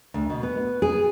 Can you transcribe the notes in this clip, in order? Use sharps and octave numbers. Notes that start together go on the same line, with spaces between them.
D2
B2
B3
G#4